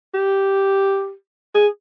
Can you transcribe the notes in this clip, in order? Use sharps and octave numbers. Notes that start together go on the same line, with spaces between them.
G4
G#4